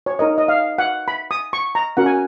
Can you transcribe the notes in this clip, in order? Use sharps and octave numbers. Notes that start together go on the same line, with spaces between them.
C#5
D#4 A#4 C#5 D#5
D#5
F5
F#5
B5
D#6
C#6
A#5
C#4 F#4 A#4 F#5
G#5